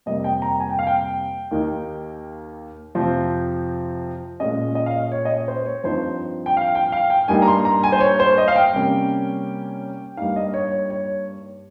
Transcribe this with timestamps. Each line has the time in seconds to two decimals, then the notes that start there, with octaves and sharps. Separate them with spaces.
0.06 F2 C3 G3 A#3 D#5
0.24 G5
0.42 A#5
0.60 G#5
0.70 G5
0.79 F5
0.87 G5
1.51 D#2 D#3 A#3 D#4
2.95 F2 C3 F3 C4
4.40 A#2 G#3 C#4 D#5
4.75 D#5
4.86 F5
4.96 D#5
5.12 C#5
5.25 D#5
5.30 C#5
5.48 C5
5.66 C#5
5.84 G2 F3 C4 D#4 C5
6.46 G5
6.57 F5
6.75 G5
6.92 F5
7.10 G5
7.28 G2 G3 A#3 D#4 G#5
7.42 A#5
7.47 C6
7.65 A#5
7.84 G#5
7.92 C5
8.01 C#5
8.20 C5
8.38 D#5
8.48 F5
8.56 G5
8.73 C3 G3 A#3 C#4
10.17 G2 G3 A#3 D#4 F5
10.36 D#5
10.54 C#5
10.71 C#5
10.90 C#5